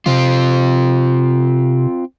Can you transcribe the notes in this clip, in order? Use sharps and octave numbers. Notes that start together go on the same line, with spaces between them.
C3 C4 F4